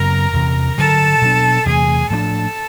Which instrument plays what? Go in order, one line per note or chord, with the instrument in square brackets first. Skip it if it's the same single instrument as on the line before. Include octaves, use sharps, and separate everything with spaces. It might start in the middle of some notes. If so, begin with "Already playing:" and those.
Already playing: [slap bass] F#2 C#3 F#3 B3 [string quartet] A#4 A#5
[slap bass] E2 C3 E3
[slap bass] G2 D3 F#3 [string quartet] A4 A5
[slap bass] B2 F#3 A#3 D4
[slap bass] E2 C3 E3 A3 [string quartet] G#4 G#5
[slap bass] A2 F3 A#3 D4 [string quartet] A4 A5